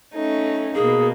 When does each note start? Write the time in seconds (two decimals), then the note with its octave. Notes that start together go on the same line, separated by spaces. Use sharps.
0.13 A3 C#4 D#4
0.75 B2 A#3 G#4